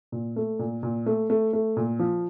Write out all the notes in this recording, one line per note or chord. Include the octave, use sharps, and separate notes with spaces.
A#2
A3
A#2
A#2
A3
A3
A3
A#2
F3